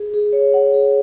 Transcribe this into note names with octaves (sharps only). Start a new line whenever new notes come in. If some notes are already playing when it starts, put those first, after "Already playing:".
Already playing: G#4
G#4
C#5
F#5
G#4